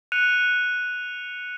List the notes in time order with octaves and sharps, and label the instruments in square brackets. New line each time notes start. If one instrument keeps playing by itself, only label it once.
[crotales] F#6 C#7 D#7 F7